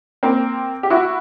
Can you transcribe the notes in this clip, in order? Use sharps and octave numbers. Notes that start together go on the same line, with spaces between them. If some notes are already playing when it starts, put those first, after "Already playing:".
A#3 C4
G4
E4 F#4